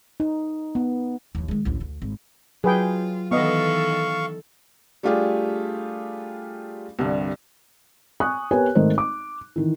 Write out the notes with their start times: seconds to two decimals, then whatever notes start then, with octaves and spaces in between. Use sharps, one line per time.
0.20 D#4
0.75 B3
1.35 D#2 E3
1.48 D#3 G#3
1.65 A1 D2
1.80 D2 D3
2.02 G#1
2.64 F#3 F4 G#4 B4 G5
3.31 D#3 E3 B3 A4 D#5 F5 C#6
5.03 G3 A3 D4 F4 G4 G#4
6.99 C2 G2 D3
8.20 G#5 C#6 D#6 F#6
8.51 B3 G4 A#4 B4 C#5 G#5
8.75 G#1 A3 A#4 C5 D#5
8.98 D6
9.56 D#3 E3